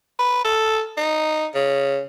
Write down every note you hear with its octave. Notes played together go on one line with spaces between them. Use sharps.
B4
A4
D#4
C#3